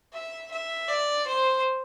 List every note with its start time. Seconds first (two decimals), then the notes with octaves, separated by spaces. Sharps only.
0.13 E5
0.51 E5
0.88 D5
1.27 C5